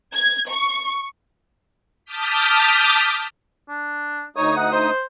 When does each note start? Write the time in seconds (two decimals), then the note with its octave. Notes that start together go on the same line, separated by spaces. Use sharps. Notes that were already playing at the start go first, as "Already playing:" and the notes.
0.14 G#6
0.49 C#6
2.05 A5 D6 D#6 F6 G6 B6
3.69 D4
4.36 D2 D#4 C#5 D#6
4.57 F#5
4.72 C5